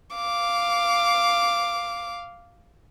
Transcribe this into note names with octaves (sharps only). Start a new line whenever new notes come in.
F5 D6